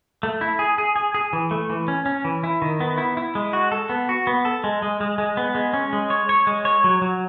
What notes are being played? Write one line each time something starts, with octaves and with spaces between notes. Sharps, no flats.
A3
E4
G#4
G#4
G#4
G#4
E3
A3
E3
C#4
C#4
E3
E4
D#3
B3
E4
E4
G#3
F#4
A4
B3
F#4
B3
A4
G#3
G#3
G#3
G#3
B3
G#3
C#4
G#3
C#5
C#5
G#3
C#5
F#3
F#3